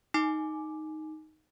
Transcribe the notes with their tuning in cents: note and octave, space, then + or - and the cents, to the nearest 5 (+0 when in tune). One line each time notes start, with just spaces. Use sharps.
D#4 +0 G#5 +25 D6 +0